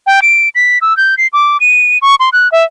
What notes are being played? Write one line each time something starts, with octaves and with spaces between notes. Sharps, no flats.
G5
D7
B6
E6
G6
C7
D6
D#7
C#6
C6
F#6
E5